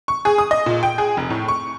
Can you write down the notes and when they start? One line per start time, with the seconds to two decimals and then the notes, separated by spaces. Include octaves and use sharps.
0.08 C#6
0.25 G#4
0.38 D#6
0.51 D#5
0.66 A#2
0.83 G5
0.98 G#4
1.17 F1
1.30 A2
1.48 C#6